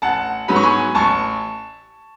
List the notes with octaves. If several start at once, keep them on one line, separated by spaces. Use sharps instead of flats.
A1 F#5 A5
G#2 F#3 B3 B5
C#6
G#5 B5
A1 A5 C#6